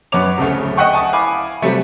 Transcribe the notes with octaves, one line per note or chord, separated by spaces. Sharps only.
F#2 B3 B4 C#5 D6 F7
D1 C#3 A3
D#5 E5 F#5 G5 C#6
G#5 A5 D#6
E4 F5 G#5 B5 D6
C3 F#3 G3 A3